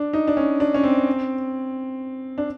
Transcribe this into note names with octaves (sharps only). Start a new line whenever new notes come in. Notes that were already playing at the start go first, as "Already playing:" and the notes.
Already playing: D4
D#4
D4
C#4
D4
C#4
C4
D4